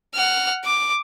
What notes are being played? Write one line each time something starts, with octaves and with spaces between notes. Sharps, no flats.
F#5 F6
D6